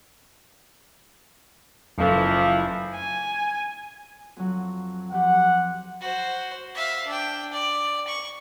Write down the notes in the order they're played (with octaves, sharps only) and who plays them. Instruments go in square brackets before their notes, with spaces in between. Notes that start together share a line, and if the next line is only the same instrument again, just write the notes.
[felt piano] F#1 A3 [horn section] E3 F3
[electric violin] G#5
[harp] F2 F#3
[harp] F3 G4 [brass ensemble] F#5
[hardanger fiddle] F#4 C5
E5 F5
D4 G5
D5
C#6